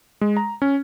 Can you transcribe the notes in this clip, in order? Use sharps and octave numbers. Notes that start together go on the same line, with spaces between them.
G#3
A#5
C#4